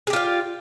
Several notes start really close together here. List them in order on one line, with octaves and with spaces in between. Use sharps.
G#4 G4 F4 F5